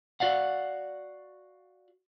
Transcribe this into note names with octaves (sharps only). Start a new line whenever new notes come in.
F#4 D5 F5 F#5